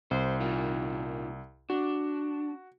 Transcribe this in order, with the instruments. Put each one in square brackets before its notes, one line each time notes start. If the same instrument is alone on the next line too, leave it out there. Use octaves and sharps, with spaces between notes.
[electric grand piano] C2 [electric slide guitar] C5
[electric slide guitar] A#2 D#3 F4
[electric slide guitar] D4 [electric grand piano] F#4